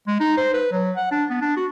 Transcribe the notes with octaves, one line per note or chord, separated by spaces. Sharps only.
G#3
D#4
C5
B4
F#3
F#5
D4
B3
D4
F#4